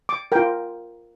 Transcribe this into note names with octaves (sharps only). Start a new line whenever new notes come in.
D6
F4 A#4 G5